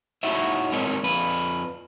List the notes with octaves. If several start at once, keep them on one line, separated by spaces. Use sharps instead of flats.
D#4 E4 F#4 C#5 E5
G#3 C4 D#4 A#4 C#5
F2 B4